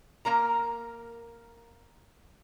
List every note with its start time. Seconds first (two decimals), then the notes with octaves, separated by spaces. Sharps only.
0.25 A#3 A#4 A#5